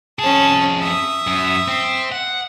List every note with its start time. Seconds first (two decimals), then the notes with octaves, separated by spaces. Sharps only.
0.19 F2 C#4 G#4 A5
0.81 E5 D#6
1.27 F#2
1.68 C4
2.12 F#5